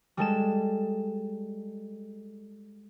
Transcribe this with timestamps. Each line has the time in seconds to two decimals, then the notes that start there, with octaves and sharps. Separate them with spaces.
0.17 G3 G#3 A4 E7